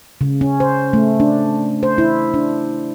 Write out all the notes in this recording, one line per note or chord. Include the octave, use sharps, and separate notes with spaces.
C#3
C#4
C5
A3
D4
C5
E4
D4